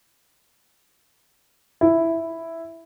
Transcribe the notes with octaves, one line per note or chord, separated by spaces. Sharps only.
E4